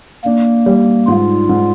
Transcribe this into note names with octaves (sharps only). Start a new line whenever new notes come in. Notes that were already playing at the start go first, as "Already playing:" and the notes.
A#3 D4
G3
G#2 F4
G#2